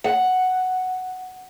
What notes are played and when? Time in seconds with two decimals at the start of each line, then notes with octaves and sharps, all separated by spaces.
0.04 F#5